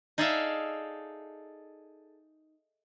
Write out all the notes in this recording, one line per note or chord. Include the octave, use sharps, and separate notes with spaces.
D#4 G#4 A4 D5 E5 F5